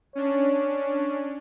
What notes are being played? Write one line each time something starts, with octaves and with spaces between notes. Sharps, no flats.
C#4 D4 C#5